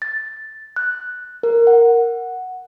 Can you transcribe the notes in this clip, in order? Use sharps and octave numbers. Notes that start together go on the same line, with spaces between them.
A6
F#6
A#4
F#5